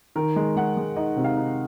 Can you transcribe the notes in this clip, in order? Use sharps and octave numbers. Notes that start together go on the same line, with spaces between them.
D#3 A#4
G#3
G#3 F#5
G#3
D#4 D#5
C3
F5
D#4